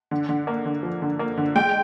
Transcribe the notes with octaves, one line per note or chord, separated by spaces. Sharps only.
D3
D3
A#3
D3
F3
D3
A#3
D3
G#3 G5